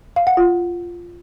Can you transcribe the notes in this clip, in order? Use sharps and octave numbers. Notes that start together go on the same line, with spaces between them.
F5
F#5
F4